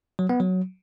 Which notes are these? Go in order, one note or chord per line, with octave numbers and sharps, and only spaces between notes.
F#3
B3
F#3